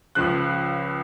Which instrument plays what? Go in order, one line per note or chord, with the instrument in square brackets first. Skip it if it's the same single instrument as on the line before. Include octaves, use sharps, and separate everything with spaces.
[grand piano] C#2 C#3 F3 F#6